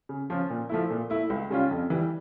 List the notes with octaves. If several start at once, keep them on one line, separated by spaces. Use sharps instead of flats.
C#3
F3 C#4 F4
A#2
F3 A3 E4
A#2
A3 E4
C#2
C#3 G3 C#4 F4
F2
E3 G3